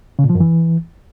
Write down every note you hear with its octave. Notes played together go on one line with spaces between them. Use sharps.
C#3
A#2
F3
F#2
E3